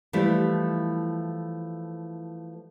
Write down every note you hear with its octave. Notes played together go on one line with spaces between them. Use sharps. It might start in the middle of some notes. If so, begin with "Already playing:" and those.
E3 F3 G3 A3 E4